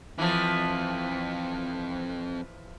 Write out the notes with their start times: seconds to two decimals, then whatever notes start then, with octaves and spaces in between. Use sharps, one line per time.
0.18 F2 E3 F3